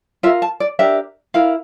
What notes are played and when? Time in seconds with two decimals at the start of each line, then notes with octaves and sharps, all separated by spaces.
0.23 F4 A#4 E5
0.42 A5
0.60 D5
0.79 D4 G4 A#4 E5
1.34 E4 A#4 F5